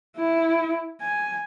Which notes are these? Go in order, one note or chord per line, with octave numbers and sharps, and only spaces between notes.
E4
G#5